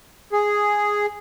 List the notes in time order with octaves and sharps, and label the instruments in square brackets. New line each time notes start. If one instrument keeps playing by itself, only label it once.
[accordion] G#4